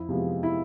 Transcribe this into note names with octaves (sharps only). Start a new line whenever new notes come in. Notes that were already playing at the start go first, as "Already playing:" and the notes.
Already playing: F2 E4
C3 F3 G#3 B3
E4